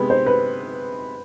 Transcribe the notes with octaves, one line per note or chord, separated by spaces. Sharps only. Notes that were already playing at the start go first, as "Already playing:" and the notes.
Already playing: C3 G#3 B3 B4
C5
B4